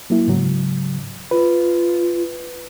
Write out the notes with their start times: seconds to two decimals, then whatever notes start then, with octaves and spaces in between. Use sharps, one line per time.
0.10 F#3 A#3 E4
0.27 G#2 C#3 F#3
1.31 F4 B4